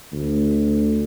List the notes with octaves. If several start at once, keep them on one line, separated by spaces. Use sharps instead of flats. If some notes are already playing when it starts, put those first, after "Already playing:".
D2